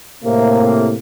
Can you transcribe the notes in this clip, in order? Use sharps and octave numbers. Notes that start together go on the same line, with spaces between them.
A2 C3 A#3